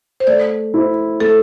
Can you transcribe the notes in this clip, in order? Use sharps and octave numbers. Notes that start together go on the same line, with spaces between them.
C5
A3 D5
E4 C5
A3 A4